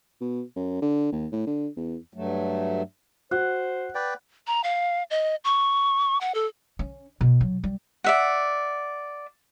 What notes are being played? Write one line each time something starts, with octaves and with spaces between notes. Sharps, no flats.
B2
F#2
D3
D#2
A2
D3
E2
G2 F#3 A3
F#4 C5 F#5
B4 D5 G5
A#5
F5
D#5
C#6
F#5
A4
C#4
B2
F#3
G3
D5 E5 F#5